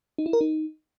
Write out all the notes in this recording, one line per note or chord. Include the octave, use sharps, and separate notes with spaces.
D#4
E4
A#4
D#4